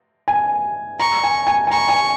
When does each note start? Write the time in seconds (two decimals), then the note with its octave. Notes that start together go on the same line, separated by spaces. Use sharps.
0.28 G#5
1.00 A#5 C#6
1.24 G#5
1.47 G#5
1.67 G#5
1.71 A#5 C#6
1.89 G#5